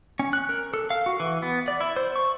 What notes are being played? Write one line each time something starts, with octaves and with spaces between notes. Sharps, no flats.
C#4
F#6
A#4
A4
F5
F#4
E3
B3
D5
E4
C5
C#6